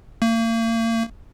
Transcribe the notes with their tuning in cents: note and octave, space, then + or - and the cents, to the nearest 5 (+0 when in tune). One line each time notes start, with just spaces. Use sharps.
A#3 -40